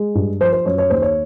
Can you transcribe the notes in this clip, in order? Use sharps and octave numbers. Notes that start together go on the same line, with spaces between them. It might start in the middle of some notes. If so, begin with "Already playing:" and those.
Already playing: G#3
G2
F3 C5
C5
F#2 C#5
C#5
D#2 C5
C#5